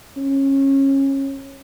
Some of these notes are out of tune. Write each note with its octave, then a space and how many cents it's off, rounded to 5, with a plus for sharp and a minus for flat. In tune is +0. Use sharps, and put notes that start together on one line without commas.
C#4 -25